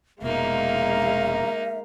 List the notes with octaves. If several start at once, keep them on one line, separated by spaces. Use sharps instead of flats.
F1 B2 G#3 A#3 D#4 E5 F5